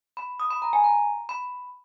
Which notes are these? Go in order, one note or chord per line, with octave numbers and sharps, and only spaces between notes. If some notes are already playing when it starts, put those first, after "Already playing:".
B5
D#6
B5
A#5
G#5
A#5
B5